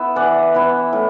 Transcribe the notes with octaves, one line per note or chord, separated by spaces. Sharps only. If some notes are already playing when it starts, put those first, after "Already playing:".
Already playing: B3 E4 E5
E3 D5 F#5
B3 E4
A2